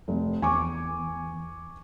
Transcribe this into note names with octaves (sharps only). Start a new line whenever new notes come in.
F1
E2 G#5 C#6 D6